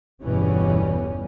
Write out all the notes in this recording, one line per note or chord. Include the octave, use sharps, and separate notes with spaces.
G1 E2 B2 E3 G3 C#4